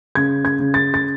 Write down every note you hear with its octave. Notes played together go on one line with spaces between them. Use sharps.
C#3 G#6
G#6
C#3
A6
A6